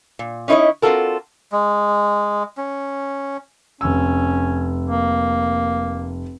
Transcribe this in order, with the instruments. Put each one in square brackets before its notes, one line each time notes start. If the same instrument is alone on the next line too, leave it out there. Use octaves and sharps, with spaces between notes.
[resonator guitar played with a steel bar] A#2
C#4 D#4 E4 C5 C#5 D#5
C4 D4 F4 F#4 A4 A#4
[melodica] G#3
C#4
[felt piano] F1 E6 [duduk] C#4
[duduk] A#3